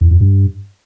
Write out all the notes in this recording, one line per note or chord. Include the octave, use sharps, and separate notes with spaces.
E2
F2
G2